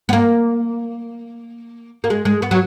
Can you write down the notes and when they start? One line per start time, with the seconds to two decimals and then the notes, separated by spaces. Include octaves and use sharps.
0.09 B3
0.13 A#3
2.04 A#3
2.10 G#3
2.25 G#3
2.42 B3
2.51 F#3